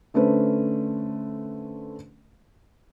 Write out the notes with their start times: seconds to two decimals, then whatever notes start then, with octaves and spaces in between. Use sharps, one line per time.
0.14 D3 A3 C#4 B4 C5